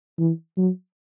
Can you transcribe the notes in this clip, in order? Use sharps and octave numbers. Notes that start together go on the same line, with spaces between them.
E3
F#3